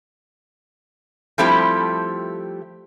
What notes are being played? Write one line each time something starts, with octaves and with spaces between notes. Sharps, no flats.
F3 G3 A3 C4 E4 G4